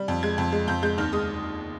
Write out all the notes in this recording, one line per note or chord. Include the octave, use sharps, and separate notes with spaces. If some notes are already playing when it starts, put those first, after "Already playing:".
Already playing: G3
F2
G#3 G#6
F2
G#3
F2 G6
G#3 G6
D#2 F6
G#3 D#6